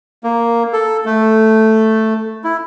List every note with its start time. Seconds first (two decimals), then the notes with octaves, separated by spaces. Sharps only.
0.24 A#3
0.73 A4
1.06 A3
2.44 E4